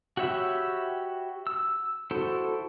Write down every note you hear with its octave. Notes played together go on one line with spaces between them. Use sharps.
F#4 G4 C#5 E5 B5
E6
E4 F#4 A4 C5